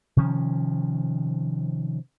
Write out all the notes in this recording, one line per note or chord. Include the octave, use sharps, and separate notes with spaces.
C3 D#3 F3 C#4